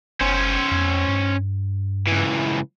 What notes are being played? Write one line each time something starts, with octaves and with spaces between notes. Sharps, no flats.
F#1 C#4 C5
F2
G2
C#2 E3